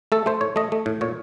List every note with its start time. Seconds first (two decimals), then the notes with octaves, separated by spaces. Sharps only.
0.12 A3 A4
0.26 A3 C5
0.41 A2 C#5
0.56 A3 D#5
0.72 A3
0.86 A2
1.01 A#2 C#5